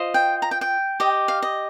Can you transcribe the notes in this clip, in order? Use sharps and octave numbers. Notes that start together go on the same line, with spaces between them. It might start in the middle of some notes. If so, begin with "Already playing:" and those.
Already playing: F4 C5 D#5
G5
A#5
G5
G5
G4 D#5
F5
D#5